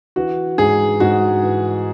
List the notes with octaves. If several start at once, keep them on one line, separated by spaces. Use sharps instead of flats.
E3 F#4
G#2 G#4
G#2 F#4
E3